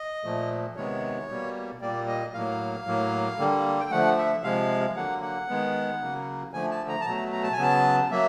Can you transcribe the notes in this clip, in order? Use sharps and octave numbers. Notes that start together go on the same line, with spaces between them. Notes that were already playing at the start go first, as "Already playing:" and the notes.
Already playing: D#5
A#2 F3 A3
C3 D#3 G#3 B3 C#5
B2 G3 A#3
A#2 G3 A#3 D5
D#5
A2 F#3 A#3 F5
A2 F#3 A#3
D3 G3 A#3
G5
D3 F3 A3 F#5
E5
C3 F3 G#3 F5
D3 F#3 A#3 F#5
F#5
D#3 G#3 B3
C#3 F#3 A#3
D3 F3 A3 G#5
A5
A#5
A5
B2 F#3 A3 A#5
A#5
A5
G#5
C#3 F#3 B3 A5
F#3 A#3 E5